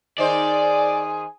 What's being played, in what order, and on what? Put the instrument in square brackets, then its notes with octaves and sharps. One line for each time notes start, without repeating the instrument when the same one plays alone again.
[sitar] D#3 D#4 C5 [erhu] G#4 [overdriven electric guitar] D5